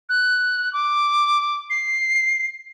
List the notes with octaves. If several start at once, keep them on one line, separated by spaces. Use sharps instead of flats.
F#6
D6
C7